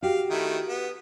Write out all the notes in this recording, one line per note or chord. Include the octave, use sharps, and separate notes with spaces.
F#4 G4 F5
D#3 A3 E4
B3